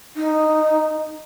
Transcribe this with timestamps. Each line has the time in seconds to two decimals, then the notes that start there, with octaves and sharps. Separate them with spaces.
0.17 D#4